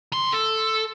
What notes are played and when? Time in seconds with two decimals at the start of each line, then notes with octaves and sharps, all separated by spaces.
0.12 D#3 C6
0.32 A4